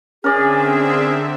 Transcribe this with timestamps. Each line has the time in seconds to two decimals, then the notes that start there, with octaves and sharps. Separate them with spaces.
0.24 D3 C4 C#4 G#4 A#4 D5 E5